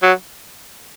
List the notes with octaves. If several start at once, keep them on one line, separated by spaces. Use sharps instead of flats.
F#3